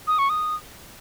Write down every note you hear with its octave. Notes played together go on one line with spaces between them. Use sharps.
D#6
C#6
D#6